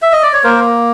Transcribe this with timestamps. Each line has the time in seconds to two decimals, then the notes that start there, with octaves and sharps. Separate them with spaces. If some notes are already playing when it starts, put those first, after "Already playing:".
0.02 E5
0.12 D#5
0.23 D5
0.33 C#5
0.44 A#3 A#4 C5